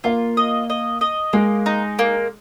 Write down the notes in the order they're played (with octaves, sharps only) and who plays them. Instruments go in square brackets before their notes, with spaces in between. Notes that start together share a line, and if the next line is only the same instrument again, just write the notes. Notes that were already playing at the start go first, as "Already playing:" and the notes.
[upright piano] A#3 [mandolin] F4
[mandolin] D#5
D#5
D#5
[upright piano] G#3 [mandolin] A#3
[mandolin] D#4
A#3